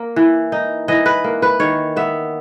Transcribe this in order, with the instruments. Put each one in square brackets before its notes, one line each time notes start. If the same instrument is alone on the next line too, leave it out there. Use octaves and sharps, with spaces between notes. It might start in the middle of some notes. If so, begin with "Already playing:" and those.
Already playing: [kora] A#3
E3
D#4
E3 D#5
B4
A#3
B4
D#3 C#5
B3 E5